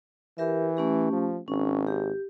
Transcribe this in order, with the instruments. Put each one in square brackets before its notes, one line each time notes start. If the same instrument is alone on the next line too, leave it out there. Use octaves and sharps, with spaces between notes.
[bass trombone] E3 [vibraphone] G4 A#4 E5
[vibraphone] A3 C#4 G4
[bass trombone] F3
[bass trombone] G#1 [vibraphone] C#4
[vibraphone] G4